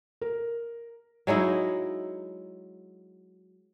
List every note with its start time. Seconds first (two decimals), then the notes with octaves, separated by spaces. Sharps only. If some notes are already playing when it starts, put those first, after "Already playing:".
0.21 A#4
1.27 F#3 G#3 D#4 E4